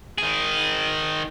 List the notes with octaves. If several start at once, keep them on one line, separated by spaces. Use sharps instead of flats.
D#3 G#4